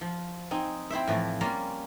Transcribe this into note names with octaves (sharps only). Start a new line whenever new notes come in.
F3
C4 D#4 G#5
C4 E4 C5 E5
A2 E3 F3
G3 A#3 C#4 F4 A#4 F5